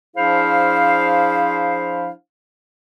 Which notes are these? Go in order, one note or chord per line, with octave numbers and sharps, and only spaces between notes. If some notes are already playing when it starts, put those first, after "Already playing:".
F3 D4 E4 G#4 C5 F5